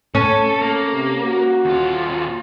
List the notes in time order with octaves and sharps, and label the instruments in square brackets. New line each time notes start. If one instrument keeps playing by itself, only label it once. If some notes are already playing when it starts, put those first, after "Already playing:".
[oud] C#4 [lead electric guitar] A4
[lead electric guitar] A#3 [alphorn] A4
[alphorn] C3
F#4
[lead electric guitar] D#2 F4